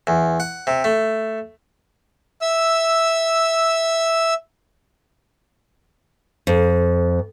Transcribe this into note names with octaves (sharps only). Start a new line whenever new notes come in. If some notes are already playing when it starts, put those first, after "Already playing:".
E2
F#5
C3
A3
E5 E6
F2